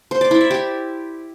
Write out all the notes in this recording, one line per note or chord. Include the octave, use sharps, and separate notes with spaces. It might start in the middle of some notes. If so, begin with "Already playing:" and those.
C5
D5
E4
E5
G4